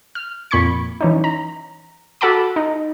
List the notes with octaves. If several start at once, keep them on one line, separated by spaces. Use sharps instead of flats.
F6
F2 A#2 B5 C#6 G#6 C#7
E3 C#4 D#4
A#5
F#4 A4 F#5 A5 B5 D6
D#4